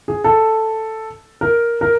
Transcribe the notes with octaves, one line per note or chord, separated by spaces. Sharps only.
G#4
A4
A#4
A#4